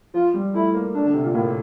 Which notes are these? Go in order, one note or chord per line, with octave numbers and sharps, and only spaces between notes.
F3 F4
G3
A3 E4
A#3
A3 D4
D3
C3
A#2
A2 A#3